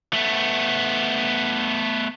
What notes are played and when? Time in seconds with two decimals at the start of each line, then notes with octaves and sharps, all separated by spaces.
0.13 A3 B3